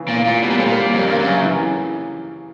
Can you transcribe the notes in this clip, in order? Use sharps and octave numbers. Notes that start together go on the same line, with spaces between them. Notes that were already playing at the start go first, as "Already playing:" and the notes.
Already playing: C#3 E3
A#2 F4
A#2 F4
B2 G3
A#2
A2 C4
A#2
G3
F2 A#3
G2 A#3
F#2
C#3
E3